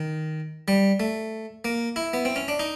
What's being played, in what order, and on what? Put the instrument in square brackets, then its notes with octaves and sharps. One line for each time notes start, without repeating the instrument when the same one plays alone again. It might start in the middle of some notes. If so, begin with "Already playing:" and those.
Already playing: [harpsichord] D#3
G3
A3
A#3
E4
B3
C4
C#4
D4
D#4